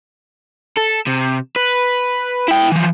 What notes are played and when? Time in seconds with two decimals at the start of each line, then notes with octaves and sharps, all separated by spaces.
0.77 A4
1.07 C3
1.56 B4
2.48 E4 G5
2.72 E3 F3